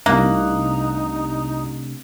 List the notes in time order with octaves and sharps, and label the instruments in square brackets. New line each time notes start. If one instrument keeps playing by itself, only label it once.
[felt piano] C2 F#6 [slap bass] C3 A3 D4 [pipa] A#3 [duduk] D#4